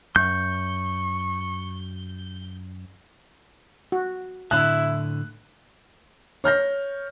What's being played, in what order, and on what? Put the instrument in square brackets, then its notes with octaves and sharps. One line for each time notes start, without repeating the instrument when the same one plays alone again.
[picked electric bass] F#2 [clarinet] C#6 [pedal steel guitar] G6
[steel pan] F#4
[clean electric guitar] A2 D3 [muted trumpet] E4 [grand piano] F#6
[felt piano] C#5 F6 G6 A#6